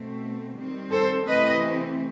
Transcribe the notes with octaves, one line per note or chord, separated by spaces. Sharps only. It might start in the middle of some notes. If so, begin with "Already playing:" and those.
Already playing: B2 A3 C4
D#3 G3 C4
A4 C5
C3 E3 A3 C4 B4 D#5